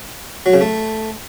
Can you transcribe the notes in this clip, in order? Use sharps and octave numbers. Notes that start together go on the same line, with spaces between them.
F#3
C#3
A3